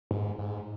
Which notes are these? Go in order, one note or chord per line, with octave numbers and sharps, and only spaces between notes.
G#2
G#2